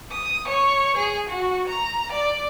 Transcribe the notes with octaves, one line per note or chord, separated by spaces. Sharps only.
D#6
C#5
G#4
F#4
A#5
D5